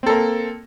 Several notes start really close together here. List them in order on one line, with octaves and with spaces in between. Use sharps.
C4 A4 A#3